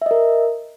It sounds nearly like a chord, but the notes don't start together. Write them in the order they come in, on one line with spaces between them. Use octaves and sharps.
E5 D#5 A#4